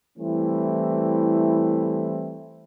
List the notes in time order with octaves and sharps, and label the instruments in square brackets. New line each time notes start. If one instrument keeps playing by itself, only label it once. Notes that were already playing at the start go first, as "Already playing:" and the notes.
[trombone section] E3 G3 A3 C4 E4